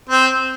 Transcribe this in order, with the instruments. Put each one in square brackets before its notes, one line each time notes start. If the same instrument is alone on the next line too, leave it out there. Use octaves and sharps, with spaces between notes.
[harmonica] C4